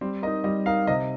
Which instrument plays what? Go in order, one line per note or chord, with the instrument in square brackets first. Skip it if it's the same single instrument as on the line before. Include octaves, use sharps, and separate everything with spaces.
[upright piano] G3 [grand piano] C4
[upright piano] A#4 [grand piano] D#5
[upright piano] D#4
[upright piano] G3 [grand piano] D#5
[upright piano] D#4 A#4 [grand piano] F5
[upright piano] C3 [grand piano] D#5